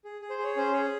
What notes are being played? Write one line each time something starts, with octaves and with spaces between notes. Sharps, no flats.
G#4
G#4
C5
G#4
C#5
C#4 C5
G#4 C#5